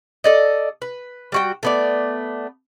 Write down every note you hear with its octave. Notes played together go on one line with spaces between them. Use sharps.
A4 D5 D#5
B4
G3 F#4 G5
A3 B3 D5